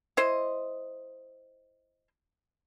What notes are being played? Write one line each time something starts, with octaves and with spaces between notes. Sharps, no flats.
E4 C5 D#5